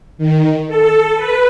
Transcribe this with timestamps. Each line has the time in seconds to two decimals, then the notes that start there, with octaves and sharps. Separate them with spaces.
0.18 D#3
0.68 A4
1.15 B4